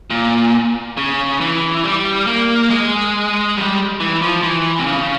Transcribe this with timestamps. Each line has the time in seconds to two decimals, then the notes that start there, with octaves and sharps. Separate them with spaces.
0.10 A#2
0.97 C#3
1.41 E3
1.84 G3
2.27 A#3
2.70 G#3
3.57 G3
4.00 E3
4.22 F3
4.43 E3
4.79 C3
4.86 C#3